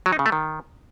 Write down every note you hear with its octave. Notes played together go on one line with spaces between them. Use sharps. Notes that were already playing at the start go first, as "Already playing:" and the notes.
F#3
D#4
C#3
A3
D#3